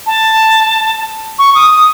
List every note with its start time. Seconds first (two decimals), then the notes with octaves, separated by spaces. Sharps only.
0.07 A5
1.39 C#6
1.55 D#6
1.71 D#6